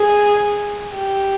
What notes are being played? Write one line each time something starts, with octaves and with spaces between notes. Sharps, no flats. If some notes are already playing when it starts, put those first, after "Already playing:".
Already playing: G#4
G4